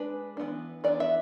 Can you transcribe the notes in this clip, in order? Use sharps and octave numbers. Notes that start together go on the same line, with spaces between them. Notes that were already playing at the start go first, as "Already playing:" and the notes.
Already playing: G#3 D4 B4
E3 B3 D4
E3 B3 D4 D5
E5